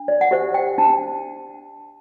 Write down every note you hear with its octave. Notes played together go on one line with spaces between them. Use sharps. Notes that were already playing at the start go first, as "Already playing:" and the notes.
Already playing: D4
D5
F#5
G4 C5 E5
G5
D4 A5